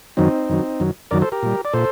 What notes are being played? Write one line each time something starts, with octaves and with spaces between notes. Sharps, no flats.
F#2 D#3 F#3 C4 D#4
F#2 D#3 F#3
F#2 D#3 F#3
F#2 D#3 F#3 A#4 D5
A4 C5
G4 A#4
A#2 G3
D5
A#2 A4 C5